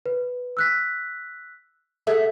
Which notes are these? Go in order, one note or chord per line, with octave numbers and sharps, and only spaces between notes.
B4
E6 F#6 B6
G#4 A4 E5 F#5